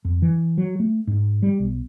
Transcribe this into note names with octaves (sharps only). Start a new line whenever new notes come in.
F2
E3
F#3
A3
G#2
G3
B1